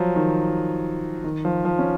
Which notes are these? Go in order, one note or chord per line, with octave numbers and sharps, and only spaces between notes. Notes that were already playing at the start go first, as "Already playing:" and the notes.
Already playing: F3 F#3
D#3
D#3
F3
F3
C#4